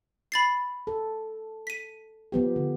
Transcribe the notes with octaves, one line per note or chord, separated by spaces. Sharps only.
B5 A6 C7
A4
B6 D#7
F3 B3 G4
D3